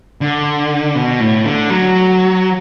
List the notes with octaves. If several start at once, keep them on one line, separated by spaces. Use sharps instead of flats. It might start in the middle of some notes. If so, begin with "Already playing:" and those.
D3
B2
A2
D3
F#3